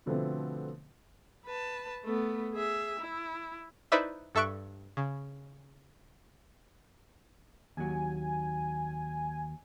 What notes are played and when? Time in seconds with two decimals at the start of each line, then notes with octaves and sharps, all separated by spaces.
0.06 B2 D3 F3 A3 B3 C4
1.45 B4 A5
2.05 A3 B3
2.54 G#4 E5
3.00 E4
3.92 D#4 E4 B4 C5 D5 E5
4.35 G2 A4 E5 C#6 F#6 D7
4.97 C#3
7.77 D#2 F#3 G#5